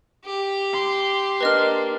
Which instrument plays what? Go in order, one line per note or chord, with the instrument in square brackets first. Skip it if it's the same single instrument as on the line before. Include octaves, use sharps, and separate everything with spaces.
[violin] G4
[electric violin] C6
[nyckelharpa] A#3 D4 [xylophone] B4 D#5 F6